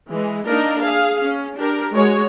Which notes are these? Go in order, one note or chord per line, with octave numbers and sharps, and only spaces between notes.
E3 G#3
A#3 D4 D#4 A#4
G#4 F5
C#4
D4 G4 A#4
G#3 F#4 C#5